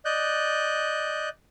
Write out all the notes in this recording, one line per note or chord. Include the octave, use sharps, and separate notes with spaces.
D5 D#5 F#6 G6